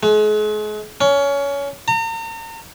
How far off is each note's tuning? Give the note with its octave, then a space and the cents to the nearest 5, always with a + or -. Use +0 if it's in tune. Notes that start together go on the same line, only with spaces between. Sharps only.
G#3 +40
C#4 +20
A#5 -40